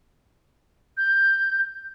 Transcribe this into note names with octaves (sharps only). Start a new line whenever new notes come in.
G6